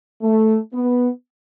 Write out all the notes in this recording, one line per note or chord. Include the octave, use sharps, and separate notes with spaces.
A3
B3